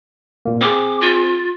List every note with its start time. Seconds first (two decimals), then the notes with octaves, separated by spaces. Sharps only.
0.45 A#2 A#3
0.61 C4 G#4 D6
1.01 F4